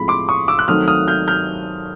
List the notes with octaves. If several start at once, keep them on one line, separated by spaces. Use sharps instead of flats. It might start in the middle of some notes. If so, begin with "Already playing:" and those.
Already playing: A2 F3 G#3 C4 B5
C6 D6
C#6 D#6
D6 E6
F#6
D#3 F#3 A3 C4 D#6 F6
D#6 F6
F6 G6
F6 G6